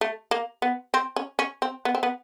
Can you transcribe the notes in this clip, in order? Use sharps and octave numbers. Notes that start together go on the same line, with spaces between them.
A3
A#3
B3
C4
C#4
C#4
C4
B3
C4
B3